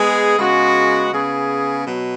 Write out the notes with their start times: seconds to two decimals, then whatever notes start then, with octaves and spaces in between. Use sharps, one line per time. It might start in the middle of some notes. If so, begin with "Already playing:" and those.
Already playing: G#3 B3 G#4
0.37 C#3 G#3 B3 F#4
1.12 C#3 B3 G#4
1.86 B2 F#3